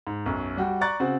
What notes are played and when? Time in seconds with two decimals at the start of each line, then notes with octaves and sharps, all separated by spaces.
0.07 G#2
0.26 B1 F#2
0.57 G3 F#4 G5
0.81 D5 A#5 C#6 F#6 A6
1.00 C#3 C4 F#4